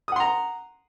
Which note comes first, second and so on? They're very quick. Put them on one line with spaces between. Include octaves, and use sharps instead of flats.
D#6 F#5 C6 A#5